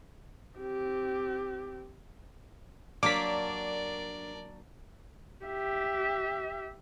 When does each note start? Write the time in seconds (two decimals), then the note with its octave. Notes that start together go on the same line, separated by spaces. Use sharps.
0.59 C4 G4
3.03 F#3 A#3 D4 A#4 D5 D6 B6
5.45 G4 E5